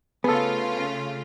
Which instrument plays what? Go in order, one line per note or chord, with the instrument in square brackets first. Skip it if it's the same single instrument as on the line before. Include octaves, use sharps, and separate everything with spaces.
[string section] C#3 A3 F4 [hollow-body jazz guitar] B3 [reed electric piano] G#4 A4